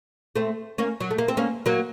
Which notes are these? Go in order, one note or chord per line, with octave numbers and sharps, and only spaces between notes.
A3 C4
A#3 C#4
F#3
A3
A#3
C4
A#3 C#4
F#3 A#3